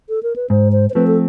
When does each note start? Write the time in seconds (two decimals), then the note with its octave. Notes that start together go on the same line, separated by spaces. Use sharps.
0.09 A4
0.23 A#4
0.36 B4
0.50 G#2 C5
0.72 C5
0.90 C5
0.94 F3 A3 C4 B4
1.07 A4